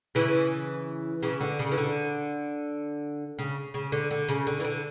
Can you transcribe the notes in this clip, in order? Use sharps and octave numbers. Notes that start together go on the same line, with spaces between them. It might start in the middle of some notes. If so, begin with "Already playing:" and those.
C#3 E3
C#3 E3
D3
C#3
E3
D3
C#3
C#3
D3
D3
C#3
D3
E3
D3